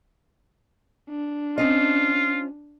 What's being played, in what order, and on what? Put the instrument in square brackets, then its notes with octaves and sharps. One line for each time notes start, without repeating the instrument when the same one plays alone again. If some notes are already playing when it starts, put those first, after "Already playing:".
[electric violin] D4
[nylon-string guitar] C4 C#4 D#5 [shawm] F4